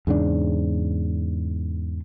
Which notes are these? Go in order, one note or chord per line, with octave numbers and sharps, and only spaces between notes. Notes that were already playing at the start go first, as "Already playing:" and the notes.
E2 G#2 C#3 D4